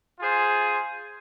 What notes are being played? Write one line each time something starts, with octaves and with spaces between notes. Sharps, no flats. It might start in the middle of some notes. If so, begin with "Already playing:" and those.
F4 G#4 C5